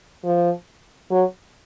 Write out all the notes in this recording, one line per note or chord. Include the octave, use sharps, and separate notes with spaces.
F3
F#3